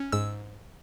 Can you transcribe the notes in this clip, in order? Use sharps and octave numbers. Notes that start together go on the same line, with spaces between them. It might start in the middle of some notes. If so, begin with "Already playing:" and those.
Already playing: C#4
G#2 E6